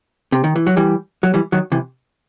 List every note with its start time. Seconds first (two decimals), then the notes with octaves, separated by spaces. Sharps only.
0.32 C3
0.44 D#3
0.56 E3
0.66 F#3
0.77 E3 G3
1.23 F#3
1.34 E3 G3
1.52 D#3 F#3
1.72 C3 E3